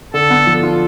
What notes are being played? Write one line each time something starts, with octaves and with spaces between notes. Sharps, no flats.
D3 A4
B3
F3
F4